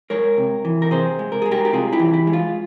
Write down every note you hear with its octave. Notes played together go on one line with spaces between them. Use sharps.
G#3 A#4 C#5
C3
E3
A#4
C3 G#4 C5
G#3
A#4
G#3 G#4
G4 A#4
G4
C3 F4 G#4
E4 G4
E3
E4
G#3
F4